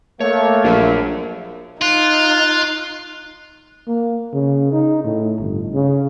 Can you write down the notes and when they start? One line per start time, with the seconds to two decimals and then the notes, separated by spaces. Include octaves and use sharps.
0.20 A3 A#3 C#5
0.64 A#1 F#3 A#4
1.82 D#4 F4 F#6
3.87 A#3
4.33 C#3
4.72 D#4
5.04 A2
5.39 G1
5.74 C#3